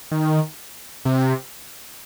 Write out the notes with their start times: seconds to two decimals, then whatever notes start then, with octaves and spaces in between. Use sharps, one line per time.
0.12 D#3
1.05 C3